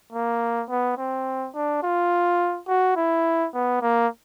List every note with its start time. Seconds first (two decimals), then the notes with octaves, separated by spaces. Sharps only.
0.13 A#3
0.69 B3
0.98 C4
1.54 D4
1.83 F4
2.68 F#4
2.97 E4
3.54 B3
3.82 A#3